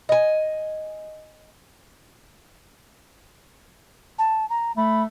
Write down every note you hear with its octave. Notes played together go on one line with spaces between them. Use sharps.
D#5 G#5
A5
A#5
A3 B5